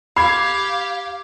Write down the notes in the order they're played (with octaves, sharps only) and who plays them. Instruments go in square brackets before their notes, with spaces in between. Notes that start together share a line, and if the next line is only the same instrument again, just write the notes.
[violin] G4 F5 [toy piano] B5 [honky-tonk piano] G#6 C7